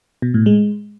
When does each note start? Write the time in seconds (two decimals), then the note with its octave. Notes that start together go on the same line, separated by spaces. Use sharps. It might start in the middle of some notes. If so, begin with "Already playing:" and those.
0.22 B2
0.34 A2
0.46 G#3